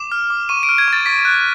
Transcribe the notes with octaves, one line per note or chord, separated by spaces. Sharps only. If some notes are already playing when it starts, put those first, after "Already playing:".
Already playing: D6 E7
F6
D6
C#6 D#7
D7
F6
G#6
C#6 A6
C#6 B6
F#6